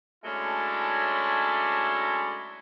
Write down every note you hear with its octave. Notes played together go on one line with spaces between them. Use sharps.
F#3 G#3 A3 C#4 D4 E4